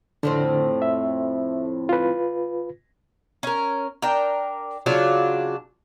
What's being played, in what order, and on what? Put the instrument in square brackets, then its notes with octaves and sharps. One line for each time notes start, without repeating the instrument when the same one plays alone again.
[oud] F2 A2 C4 [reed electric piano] D3
[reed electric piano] E5
F4 B4
[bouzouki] C#4 A#4
D4 A#4 G5
C#3 F#3 D4 F4